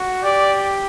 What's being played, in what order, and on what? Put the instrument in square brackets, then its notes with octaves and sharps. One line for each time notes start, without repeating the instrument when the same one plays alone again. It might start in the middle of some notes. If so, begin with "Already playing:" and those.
Already playing: [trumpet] F#4
[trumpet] G4 [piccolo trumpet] D5